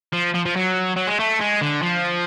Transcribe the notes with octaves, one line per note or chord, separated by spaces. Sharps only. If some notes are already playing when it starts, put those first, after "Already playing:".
F3
F3
F3
F#3
F#3
G#3
A3
G#3
D3
F3